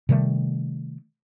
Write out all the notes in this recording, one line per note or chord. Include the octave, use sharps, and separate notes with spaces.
C3 D#3 G3 A3